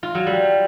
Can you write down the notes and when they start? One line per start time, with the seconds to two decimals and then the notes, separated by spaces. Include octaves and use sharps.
0.03 F4
0.15 F#3
0.26 G3